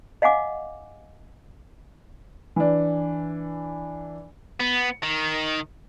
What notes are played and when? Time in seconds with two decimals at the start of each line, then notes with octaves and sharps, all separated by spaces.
0.22 D#5 F5 F#5 G#5 D6
2.56 E3 D4
4.60 B3
5.03 D#3